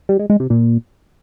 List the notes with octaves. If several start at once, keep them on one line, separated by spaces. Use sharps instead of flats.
G3
G#3
G#3
C3
A#2